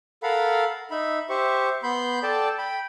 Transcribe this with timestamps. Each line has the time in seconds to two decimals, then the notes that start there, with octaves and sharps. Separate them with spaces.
0.23 A4 A#4 F5 F#5 B5
0.91 D#4 E5 B5
1.29 G4 C5 E5 C#6
1.83 B3 B5 C6 G6
2.23 A4 D5 G5 A5
2.58 G5 B5